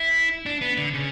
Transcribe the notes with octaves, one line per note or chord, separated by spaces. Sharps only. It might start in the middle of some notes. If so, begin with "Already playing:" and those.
Already playing: E4
D4
B3
D3
C#3